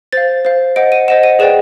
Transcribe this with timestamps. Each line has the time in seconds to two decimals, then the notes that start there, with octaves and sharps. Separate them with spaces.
0.13 C5 F5 A6
0.45 C5 F5
0.76 C5 D#5 F#5 D7
0.92 D#7
1.08 C5 D#5 F#5 E7
1.23 D#7
1.39 G#4 B4 D5 G5 E7